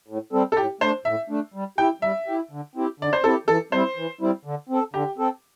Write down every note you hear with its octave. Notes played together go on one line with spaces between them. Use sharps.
A2
G3 C4 A4
A4
A2 G4
A3 D4 C5
A2 E5
A3 D4
G3
E4 G4 G5
G3 E5
E4 G4
D3
C4 E4 G4
D3 D5
C5
C4 E4 G4 A4
E3 A4
G3 C4 E4 C5
E3
G3 C4 E4
D3
C4 A4
D3 G4
C4 A4